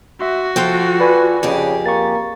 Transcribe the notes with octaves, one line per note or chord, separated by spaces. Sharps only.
F#4 E5 C6
F3 F4 A4 G5 C6
B4 D5 G#5 B5
F2 C#3 G4 G#4
A#3 C#6 A6